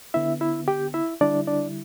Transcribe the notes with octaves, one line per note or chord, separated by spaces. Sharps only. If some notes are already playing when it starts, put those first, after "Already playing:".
D3 B3 E4 E5
E4 E5
G4 G5
E4 E5
D3 G3 D4 E4 D5
D4 D5